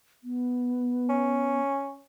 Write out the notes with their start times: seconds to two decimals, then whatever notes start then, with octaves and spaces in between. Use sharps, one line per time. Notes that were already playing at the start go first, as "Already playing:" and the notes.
0.24 B3
1.09 C#4